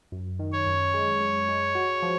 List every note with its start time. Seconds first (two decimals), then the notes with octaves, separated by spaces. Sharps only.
0.12 F#2
0.39 D#3
0.53 C#5
0.66 F#2
0.94 G#3
1.21 G#3
1.49 G#3
1.75 F#4
2.03 F3